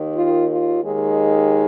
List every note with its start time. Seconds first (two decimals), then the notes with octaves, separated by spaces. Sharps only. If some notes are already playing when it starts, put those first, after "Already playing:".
Already playing: D#2 D#3
0.13 F4
0.48 F4
0.82 D#2 D#3 G#3